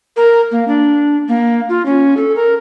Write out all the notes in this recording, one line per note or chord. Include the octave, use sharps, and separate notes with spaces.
A#4
A#3
D4
A#3
F4
C#4
A4
A#4